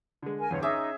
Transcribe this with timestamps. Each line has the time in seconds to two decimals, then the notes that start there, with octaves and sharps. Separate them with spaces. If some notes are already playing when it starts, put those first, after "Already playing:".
0.23 D3 G#3
0.38 A#4 G#5
0.51 E2 G2 D3 C#5
0.62 C#4 D#4 G#4 E5 D6